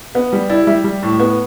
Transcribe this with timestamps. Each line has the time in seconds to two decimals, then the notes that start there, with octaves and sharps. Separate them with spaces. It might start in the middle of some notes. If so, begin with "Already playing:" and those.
0.15 B3 B4
0.33 G3
0.50 E4 D5
0.67 G3 E5
0.84 G3
1.03 A2
1.20 B3 B4